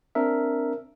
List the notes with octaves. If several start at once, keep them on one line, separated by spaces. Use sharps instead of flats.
C4 D4 A#4 E5